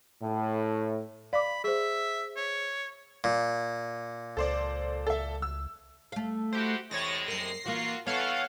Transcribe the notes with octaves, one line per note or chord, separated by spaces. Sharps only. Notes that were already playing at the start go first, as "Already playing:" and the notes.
A2
D5 F5 B5 D6
G#4 C5 E5
C#5
A#2
C#2 A4 C5 D5
A4 E5
E6
A3 F5
E4 F#4 G4 C5
E2 A2 C3 G#3 C#5 A6 A#6
F#2 A#3 A#6 C7
E3 A#3 F4 F#4
E3 B3 A4 C#5 F5 F#5